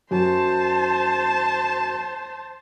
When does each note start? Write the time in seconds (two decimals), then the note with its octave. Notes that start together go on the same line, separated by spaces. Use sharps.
0.11 F#2 C5 A5